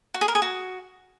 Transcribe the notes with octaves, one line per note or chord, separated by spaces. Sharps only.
F#4
G#4
A#4
G#4
F#4